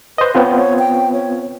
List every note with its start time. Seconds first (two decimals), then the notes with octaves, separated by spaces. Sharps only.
0.18 B4 C5 D#5
0.35 B3 C4 F4 C#5
0.55 C#5
0.79 G5
1.13 C#5